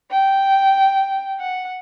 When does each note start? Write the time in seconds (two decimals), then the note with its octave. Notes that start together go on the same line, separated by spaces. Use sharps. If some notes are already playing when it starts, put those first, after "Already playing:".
0.11 G5
1.39 F#5